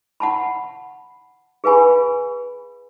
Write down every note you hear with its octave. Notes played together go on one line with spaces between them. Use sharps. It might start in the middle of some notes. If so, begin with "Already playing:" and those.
F#5 A5 B5
G#4 B4 F5 G#5 B5